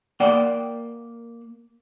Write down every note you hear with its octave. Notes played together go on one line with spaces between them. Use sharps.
A#3 D5 F#5 G5